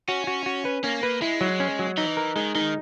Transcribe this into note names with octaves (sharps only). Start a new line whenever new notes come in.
C#4 F#4
F#4
F#4
B4
A#3 C#4
B4
G#3 E4
F#3
C#4
F#3
E3 D#4
A#4
D#3 G#3
D#3 D#4